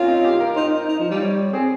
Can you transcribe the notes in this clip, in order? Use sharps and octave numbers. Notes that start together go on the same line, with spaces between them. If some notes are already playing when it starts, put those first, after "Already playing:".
Already playing: A#3 C4 C#4 F4
D#4
G4
A#4
D#4 C5
D#4
D#4
F3
G3
C#5
C4 G#4